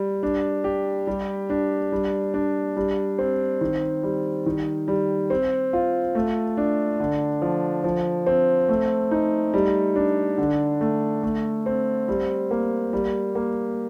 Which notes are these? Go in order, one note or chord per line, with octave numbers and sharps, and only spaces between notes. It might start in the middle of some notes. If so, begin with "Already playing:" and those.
Already playing: G3
D4
G4
G3
D4
G3
D4
G3
C4
D#3
G3
D#3
G3
C4
F4
A3
D4
D3
F3
F3
C4
A3
D#4
G3
D4
D3
A3
A3
C4
G3
A#3
G3
A#3